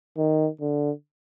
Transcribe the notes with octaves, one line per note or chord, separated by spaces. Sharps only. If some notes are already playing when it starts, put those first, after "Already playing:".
D#3
D3